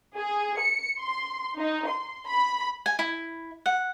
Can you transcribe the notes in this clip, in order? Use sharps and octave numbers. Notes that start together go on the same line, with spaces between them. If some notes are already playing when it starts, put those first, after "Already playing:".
G#4
C#7
C6
D#4
C6
B5
G#5
E4
F#5